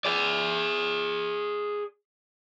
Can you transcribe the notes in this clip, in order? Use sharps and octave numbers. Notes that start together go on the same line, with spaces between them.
G#4 D5